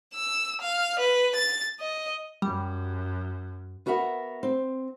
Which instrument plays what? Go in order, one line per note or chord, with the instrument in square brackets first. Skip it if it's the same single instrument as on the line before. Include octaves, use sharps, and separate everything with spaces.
[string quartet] E6
F5
B4
A6
D#5
[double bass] F#2 [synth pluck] G3
[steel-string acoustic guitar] B3 F#4 A#4 E5 F#5
C4